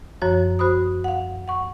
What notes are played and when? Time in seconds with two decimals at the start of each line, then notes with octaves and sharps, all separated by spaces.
0.22 F#2 F3 F#4 C#5
0.59 F#4 C5 B5 D#6
1.04 F5 F#5
1.48 F#5 C#6